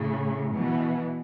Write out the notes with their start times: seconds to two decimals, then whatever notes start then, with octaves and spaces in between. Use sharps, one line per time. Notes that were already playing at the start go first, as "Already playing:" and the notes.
Already playing: A2 C#3
0.54 B2 E3